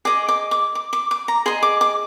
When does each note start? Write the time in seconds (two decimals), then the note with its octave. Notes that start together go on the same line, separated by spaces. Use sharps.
0.05 G#4 D#5 D6
0.29 D6
0.51 D6
0.75 D6
0.93 D6
1.11 D6
1.28 A#5
1.46 G#4 D#5 C6
1.63 D6
1.81 D6